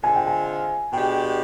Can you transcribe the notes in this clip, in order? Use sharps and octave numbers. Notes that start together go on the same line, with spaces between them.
D3 G#3 C4 F4 G#5
G5
G#5
B2 G#3 D4 G4 G5